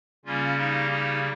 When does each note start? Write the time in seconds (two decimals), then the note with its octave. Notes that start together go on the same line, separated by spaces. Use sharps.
0.25 C#3 G3 A#3 C#4 F4
0.58 D#4 G4
0.90 D#4 G4